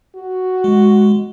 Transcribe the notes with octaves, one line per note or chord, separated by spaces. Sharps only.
F#4
G#3